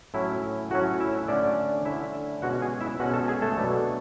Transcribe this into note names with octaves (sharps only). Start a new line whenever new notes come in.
A2 F#3 C#4 E4 E5
A2 F#3 C#4 F#4 F#5
E4 E5
D3 A3 C#4 D4 D5
D3 A3 C#4 E4 E5
B2 G#3 C#4 F#4 F#5
G#4 G#5
E4 E5
B2 G#3 C#4 F#4 F#5
A4 A5
G#4 G#5
A3 A4
B2 F#3 B3 D4